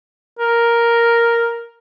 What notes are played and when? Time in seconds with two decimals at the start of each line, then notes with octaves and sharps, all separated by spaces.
0.39 A#4